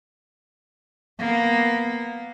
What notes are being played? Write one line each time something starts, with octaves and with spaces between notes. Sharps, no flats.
A#3 B3